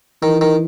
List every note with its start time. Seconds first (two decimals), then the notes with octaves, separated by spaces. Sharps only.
0.23 D#3 E3
0.41 D#3